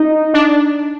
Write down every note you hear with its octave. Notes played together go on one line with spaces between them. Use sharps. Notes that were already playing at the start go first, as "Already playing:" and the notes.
Already playing: D#4
D4